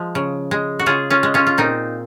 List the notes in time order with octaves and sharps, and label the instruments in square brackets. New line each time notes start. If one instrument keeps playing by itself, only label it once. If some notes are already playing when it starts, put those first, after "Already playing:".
Already playing: [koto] F3 G#3
C#3
G#3
F#4
C#3 F4 G#4
C#4 F4
G#3
C#4 F4
F4
A#2 C4 D#4